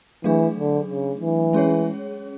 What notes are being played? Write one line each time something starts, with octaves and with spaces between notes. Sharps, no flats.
E3 F#3 A3 D4 G#4
D3
C#3
E3
G#3 C#4 G#4 C#5